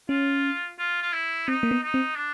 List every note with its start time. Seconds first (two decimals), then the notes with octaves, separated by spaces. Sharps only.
0.09 C#4 F4
0.79 F4
1.02 F4
1.13 E4
1.48 C4 D#4
1.63 A#3
1.71 B3
1.83 D#4
1.94 C4
2.17 D4